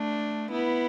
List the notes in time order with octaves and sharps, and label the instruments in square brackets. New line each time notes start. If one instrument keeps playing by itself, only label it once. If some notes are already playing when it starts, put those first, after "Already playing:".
Already playing: [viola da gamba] A3 D4
B3 E4